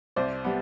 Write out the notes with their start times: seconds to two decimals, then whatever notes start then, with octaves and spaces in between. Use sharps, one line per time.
0.16 C2 C5 D5
0.45 G3 B3